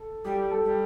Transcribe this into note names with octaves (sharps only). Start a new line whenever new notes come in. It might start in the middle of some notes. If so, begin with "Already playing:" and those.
Already playing: A4
G3 G4
A4
G3